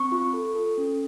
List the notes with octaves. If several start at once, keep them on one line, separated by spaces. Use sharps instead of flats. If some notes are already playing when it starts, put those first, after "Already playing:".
Already playing: C4 C#6
F4
A4
A4
C#4